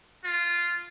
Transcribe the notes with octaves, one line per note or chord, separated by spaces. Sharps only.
F4